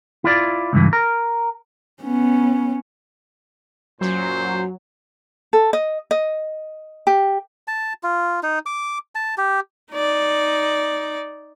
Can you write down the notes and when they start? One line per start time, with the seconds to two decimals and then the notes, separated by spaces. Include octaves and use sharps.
0.24 E4 F4 D5
0.73 C#2 G2 E3
0.93 A#4
2.02 B3 C#4
4.01 F#2 A#2 F#3 C5
5.53 A4
5.73 D#5
6.11 D#5
7.07 G4
7.68 A5
8.03 F4
8.43 D#4
8.66 D6
9.15 A5
9.38 G4
9.92 D#4 D5